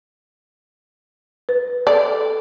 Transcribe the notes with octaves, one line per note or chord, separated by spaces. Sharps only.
B4
A4 D5